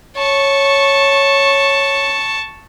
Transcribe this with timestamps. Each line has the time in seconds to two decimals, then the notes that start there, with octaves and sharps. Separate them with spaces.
0.17 C#5 A5 C#6